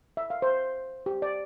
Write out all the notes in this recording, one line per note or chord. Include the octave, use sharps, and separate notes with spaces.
E5
F5
C5
G4
D5